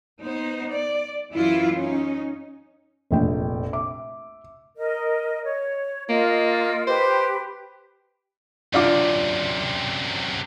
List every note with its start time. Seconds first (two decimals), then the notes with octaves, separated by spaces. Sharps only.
0.22 B3 D#4 C5
0.71 D5
1.31 F#2 E3 E4 F4
1.73 C#4 D#4
3.11 F1 A#1 G5
3.73 E5 D6
4.77 A#4 D#5
5.44 C#5
6.09 A#3 F4 D#5
6.87 G4 B4 C5
8.74 F#2 C3 D4 F4 D6